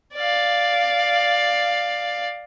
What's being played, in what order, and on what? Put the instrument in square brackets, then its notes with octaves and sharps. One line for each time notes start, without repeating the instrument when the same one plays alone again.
[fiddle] D5 F5